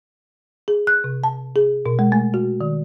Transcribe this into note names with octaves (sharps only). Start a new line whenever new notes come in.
G#4
F#6
C3
A5
G#4
B2
G#3
A3
F#4
D#3